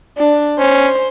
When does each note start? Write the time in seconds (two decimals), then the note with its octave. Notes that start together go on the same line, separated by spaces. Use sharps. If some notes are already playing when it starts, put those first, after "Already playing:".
0.18 D4
0.59 C#4 C5